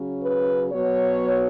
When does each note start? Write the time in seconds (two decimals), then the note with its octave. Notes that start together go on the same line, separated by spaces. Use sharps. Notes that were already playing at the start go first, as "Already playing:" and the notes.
Already playing: C#3 F#3 C#4
0.23 B4
0.73 B2 F#3 B3 C#5